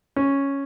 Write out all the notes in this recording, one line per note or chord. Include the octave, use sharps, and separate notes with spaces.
C#4